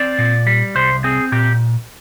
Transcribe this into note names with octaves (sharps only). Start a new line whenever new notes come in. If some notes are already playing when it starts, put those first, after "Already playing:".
Already playing: C4 D5
A#2
G3
C2 C5
C4 G#4
A#2 G4